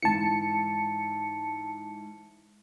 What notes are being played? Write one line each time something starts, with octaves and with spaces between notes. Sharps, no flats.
G#2 E3 A5 C#7